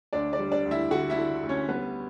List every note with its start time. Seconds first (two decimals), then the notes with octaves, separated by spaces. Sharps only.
0.13 D2 D4 D5
0.33 D4 D5
0.39 G3
0.52 D4 D5
0.65 D2
0.71 E4 E5
0.91 D3 F#4 F#5
1.10 E4 E5
1.17 D3
1.43 D2
1.49 C#4 C#5
1.69 G3 B3 B4